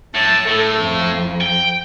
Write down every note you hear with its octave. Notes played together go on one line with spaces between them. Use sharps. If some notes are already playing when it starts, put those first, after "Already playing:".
A2 A5
A2 A4
F2
G5